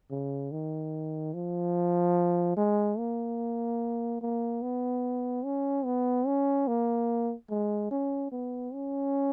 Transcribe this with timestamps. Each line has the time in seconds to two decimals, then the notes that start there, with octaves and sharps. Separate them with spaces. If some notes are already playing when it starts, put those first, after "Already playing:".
0.11 C#3
0.52 D#3
1.34 F3
2.57 G#3
2.98 A#3
4.22 A#3
4.62 B3
5.44 C#4
5.85 B3
6.27 C#4
6.68 A#3
7.50 G#3
7.91 C#4
8.32 B3
8.74 C#4